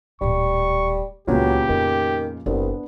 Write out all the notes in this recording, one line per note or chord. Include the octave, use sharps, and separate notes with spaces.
D1 A#2 G3 C#6
C#2 A#2 C#3 F#3 B3 D4 G4
F2 D#3
F#1 C2 B3 D4